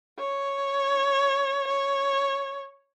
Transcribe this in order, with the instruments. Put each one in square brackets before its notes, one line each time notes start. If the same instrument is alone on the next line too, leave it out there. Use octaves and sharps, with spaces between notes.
[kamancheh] C#5
C#5